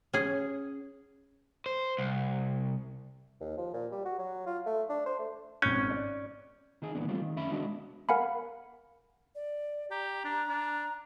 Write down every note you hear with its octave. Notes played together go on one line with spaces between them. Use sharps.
C#4 G#4
C5
C2
D#2
F3
A#2
G3
F#4
F#3
F4
A3
D4
C5
A3
G#1 C#4 G6
D5
D#3 D#4 G#4
D2 A#2 D#3 E3 B3 D4
G3 A3 C4 F4
D#3
F2 C#4 E5 B5
G#3 B3 D4 F#4 D#5
A#4 F5 F#5 G#5 B5
D5
G4 A#5
D4
D4